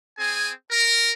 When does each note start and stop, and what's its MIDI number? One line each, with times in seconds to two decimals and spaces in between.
0.19 0.51 60
0.19 0.51 68
0.19 0.51 80
0.71 1.12 70